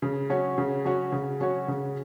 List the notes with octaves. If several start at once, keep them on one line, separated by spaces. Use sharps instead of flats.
C#3
F#3 C#4 F#4 C#5
C#3
F#3 C#4 F#4 C#5
C#3
F#3 C#4 F#4 C#5
C#3